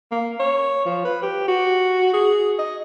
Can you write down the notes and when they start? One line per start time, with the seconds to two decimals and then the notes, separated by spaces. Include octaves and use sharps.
0.11 A#3
0.39 C#5
0.85 F3
1.05 B4
1.23 G4
1.48 F#4
2.13 G#4
2.59 D#5